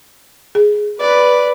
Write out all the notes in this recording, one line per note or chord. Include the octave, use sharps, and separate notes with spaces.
G#4
B4 D5